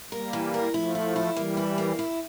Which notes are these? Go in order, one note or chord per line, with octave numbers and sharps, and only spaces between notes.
G3 A#3 A#4
E3
A#4
F3 A3 E4
E4
E4
E3 G3 A#3
E4
A#3
E4